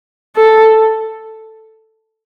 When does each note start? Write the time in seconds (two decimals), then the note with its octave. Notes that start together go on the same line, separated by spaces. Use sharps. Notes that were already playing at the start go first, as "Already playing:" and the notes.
0.36 A4